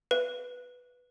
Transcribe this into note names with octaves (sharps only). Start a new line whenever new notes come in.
B4